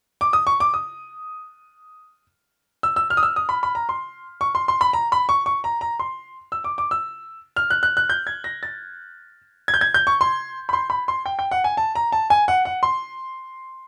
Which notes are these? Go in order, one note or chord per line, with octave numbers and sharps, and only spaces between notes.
D6
D#6
C#6
D6
D#6
E6
E6
F6
D#6
E6
D#6
B5
B5
A#5
C6
C#6
C6
C6
B5
A#5
B5
C#6
C#6
A#5
A#5
C6
E6
D6
D6
E6
F6
F#6
F#6
F#6
G6
G#6
A#6
A6
G#6
G6
G#6
G6
C#6
C6
B5
C6
B5
C6
G5
G5
F#5
G#5
A5
A#5
A5
G#5
F#5
F#5
C6